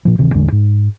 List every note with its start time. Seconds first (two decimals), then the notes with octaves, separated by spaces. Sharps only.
0.05 A#2 F3
0.18 D1 C3 D#3 E3
0.34 A1 E2 D3 G#3
0.52 G#2